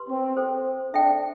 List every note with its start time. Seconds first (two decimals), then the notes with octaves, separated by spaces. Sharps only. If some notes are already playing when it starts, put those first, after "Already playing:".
Already playing: G4 B4 C6
0.08 C4
0.37 A4 C5 G5
0.94 D4 A4 E5 G5